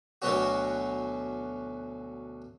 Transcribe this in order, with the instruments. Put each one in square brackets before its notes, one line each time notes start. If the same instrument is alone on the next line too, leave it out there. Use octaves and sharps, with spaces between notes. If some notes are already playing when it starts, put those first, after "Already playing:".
[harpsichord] D2 B2 F#3 B3 C#4 F#4